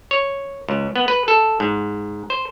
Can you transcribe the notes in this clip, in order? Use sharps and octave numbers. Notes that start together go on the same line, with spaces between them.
C#5
C#2
B3
B4
A4
G#2
C5